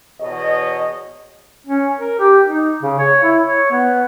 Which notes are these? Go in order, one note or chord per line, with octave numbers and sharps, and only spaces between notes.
E2 B2 C#5 D#5
C#4
A#4
G4
D#4
C#3
C#5
E4
C#5
B3